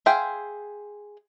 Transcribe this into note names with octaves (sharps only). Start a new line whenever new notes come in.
G#4 C5 E5 F5 G5